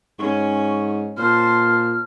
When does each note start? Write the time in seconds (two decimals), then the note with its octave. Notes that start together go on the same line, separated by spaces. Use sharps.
0.19 G#2 C#4 C#6
1.17 A#2 C5 A5 F6